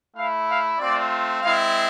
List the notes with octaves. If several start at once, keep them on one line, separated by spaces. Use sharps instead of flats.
A3 E4 F5
F5
A3 C4 F4 D5
G#3 C4 E4 F5